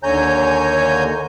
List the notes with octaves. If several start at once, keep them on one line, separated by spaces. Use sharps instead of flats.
D#2 D3 C#5 G#5 A#5 G6